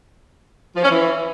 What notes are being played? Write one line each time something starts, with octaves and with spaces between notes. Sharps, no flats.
F3
C#4
E3